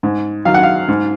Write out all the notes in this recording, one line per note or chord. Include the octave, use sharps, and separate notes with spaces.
G#2
D#3 F#3 F5
F#5
F5
G#2